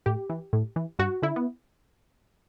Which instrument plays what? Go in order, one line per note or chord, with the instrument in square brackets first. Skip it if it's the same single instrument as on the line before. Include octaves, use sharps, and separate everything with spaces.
[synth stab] A2 G4
E3
A2
E3
G2 F#4
D3 E4
B3